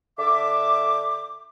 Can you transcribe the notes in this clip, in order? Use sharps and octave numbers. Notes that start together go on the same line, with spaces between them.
D3 E5 D6